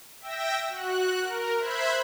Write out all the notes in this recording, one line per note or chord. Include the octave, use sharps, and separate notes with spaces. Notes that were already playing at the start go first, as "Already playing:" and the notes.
E5 G5 E6 A#6
F#4 F#6
A#4
C5 E5 B5 F#6 G#6